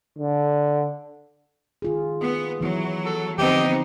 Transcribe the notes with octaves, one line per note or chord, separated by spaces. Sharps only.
D3
D#3 F4 G#4
B3
E3 F#3 B3 E4
A4
D3 F3 B3 C4 D#4 G4 D#5